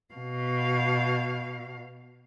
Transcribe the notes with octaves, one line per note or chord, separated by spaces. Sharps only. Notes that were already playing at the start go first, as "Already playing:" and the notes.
B2 F5